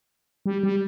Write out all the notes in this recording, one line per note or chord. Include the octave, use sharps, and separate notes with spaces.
G3
G3